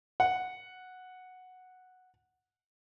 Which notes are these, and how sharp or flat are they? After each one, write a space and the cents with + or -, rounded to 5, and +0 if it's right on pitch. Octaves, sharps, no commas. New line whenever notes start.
F#5 -5